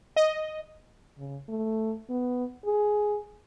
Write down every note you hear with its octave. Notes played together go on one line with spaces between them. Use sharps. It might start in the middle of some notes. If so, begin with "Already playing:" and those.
D#5
C#3
A3
B3
G#4